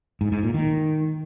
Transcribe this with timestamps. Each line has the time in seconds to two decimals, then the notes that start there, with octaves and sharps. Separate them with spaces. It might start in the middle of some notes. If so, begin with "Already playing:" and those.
0.21 G#2
0.32 G#2
0.43 A#2
0.54 D#3